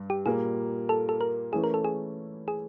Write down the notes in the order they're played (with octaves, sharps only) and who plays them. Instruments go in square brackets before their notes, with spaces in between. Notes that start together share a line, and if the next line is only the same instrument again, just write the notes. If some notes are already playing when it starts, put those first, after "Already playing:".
Already playing: [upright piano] G2
[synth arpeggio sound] G4
[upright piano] A#2 G3 A#3 [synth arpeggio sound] G#4
[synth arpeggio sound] A4
A4
A#4
[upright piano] E3 A3 C#4 E4 [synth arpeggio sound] G#4
[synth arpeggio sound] A#4
A4
G#4
G#4